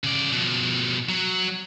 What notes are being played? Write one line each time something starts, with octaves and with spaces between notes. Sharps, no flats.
C#3 D5
B2 F3
F#3